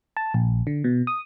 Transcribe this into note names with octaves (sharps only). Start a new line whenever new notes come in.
A5
A#1
D3
B2
D#6